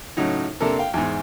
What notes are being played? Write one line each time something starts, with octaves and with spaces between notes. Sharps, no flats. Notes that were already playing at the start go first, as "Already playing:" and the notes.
A2 C#3 F#3 D#4
C3 A#3 D4 A4 A#4
F5 G5
E2 G#2